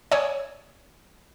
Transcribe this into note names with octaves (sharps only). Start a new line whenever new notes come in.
C#5 D5 G#5 D#6